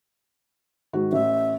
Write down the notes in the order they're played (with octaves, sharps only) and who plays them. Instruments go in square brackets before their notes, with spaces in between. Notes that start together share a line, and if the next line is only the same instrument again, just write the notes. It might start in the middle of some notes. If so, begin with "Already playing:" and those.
[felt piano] G#2 D#3 F#4
[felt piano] A1 [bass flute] E5